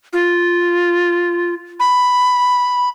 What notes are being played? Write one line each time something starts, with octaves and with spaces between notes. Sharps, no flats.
F4
B5